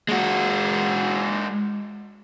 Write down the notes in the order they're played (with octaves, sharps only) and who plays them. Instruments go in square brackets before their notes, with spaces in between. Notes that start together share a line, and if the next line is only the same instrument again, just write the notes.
[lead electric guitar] G#3 F#4